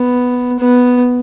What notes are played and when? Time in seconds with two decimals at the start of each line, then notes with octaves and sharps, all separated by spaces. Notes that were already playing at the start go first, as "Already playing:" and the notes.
Already playing: B3
0.60 B3